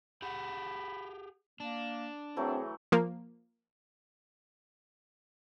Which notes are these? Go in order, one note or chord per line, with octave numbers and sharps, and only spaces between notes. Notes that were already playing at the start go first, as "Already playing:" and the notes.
G4 G#4 F#5 B5
A#3 D4
E3 F#3 A3 C4 G#4
F3 A#3